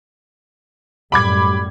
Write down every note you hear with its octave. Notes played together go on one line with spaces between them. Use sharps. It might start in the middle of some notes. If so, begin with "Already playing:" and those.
F#2 A2 G3 B5 D6 G#6